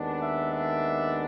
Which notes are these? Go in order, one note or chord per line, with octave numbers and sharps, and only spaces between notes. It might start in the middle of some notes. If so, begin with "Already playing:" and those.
Already playing: D#2 D#3 G#3 B3 D4
E5
E5